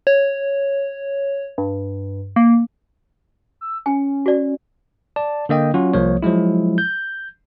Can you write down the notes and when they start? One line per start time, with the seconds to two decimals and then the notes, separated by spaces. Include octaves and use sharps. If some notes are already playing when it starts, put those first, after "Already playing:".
0.07 C#5
1.58 G2
2.36 A#3
3.61 E6
3.86 C#4 G#5
4.26 F#4 D5
5.16 D5 A5
5.49 D3 A#3 D#5 G5
5.74 F#3 C#4 F4 F#4
5.94 C2 F3 A#3 C#5
6.23 F3 F#3 G#3 E4
6.78 G6